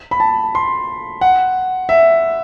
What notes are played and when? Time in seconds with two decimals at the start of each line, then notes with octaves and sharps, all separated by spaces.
0.11 B5
0.20 A5
0.55 C6
1.21 F#5
1.89 E5